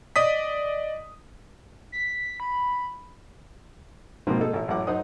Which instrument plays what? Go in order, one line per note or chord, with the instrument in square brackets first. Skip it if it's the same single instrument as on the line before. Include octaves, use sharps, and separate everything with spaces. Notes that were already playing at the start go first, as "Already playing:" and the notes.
[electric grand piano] D5 D#5 D#6 B6
[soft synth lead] B6
B5
[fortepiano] G#2 B2 F3 A#3 C4
G#3 D#4 A4
A1 A#2 E5
A1 F#2 E4 F#5 D6
F#2 D#4 C5 D#5 F#5 D#6